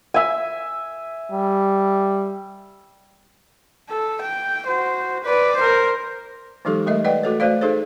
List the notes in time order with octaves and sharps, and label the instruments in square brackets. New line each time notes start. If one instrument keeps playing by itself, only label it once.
[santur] E5 G#5
[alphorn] G3
[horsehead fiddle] A4
G5
F#4 C5
B4 D5
A#4 C5
[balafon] E3 F#3 G#3 D#4 G4 A4
G3 A3 A#4 D#5 E5
B4 D5 D#5 F#5 G5
A3 F#4 A4 C#5
A3 F#4 C5 D5 F5
D#4 G#4 A4 C5 C#5